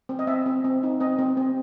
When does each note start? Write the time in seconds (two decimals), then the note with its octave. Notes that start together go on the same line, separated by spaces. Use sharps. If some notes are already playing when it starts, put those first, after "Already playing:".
0.09 C4
0.19 D#5
0.27 C4 E5
0.46 C4
0.64 C4
0.83 D#4
1.00 C4 D#5
1.19 C4
1.37 C4